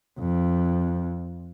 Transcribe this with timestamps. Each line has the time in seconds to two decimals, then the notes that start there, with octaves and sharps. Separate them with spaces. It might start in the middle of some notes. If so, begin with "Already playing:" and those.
0.19 F2